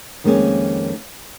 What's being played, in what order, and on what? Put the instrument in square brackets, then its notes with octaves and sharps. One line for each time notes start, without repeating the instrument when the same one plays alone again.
[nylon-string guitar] F2 D#3 G#3 A#3 C4 C#4